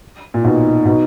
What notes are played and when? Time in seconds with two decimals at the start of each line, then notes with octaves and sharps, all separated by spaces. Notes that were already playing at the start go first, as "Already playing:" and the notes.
0.34 A#2
0.44 B2 D#4
0.85 B2